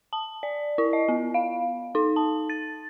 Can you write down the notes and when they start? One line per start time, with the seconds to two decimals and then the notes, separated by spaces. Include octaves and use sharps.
0.13 A5
0.43 D5
0.78 E4
0.93 D#5
1.08 B3
1.34 F5
1.95 D#4
2.16 A5
2.49 A6